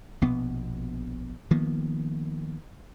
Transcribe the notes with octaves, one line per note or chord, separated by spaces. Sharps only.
A#1 B2 B3
D#3 F3 A#3 B3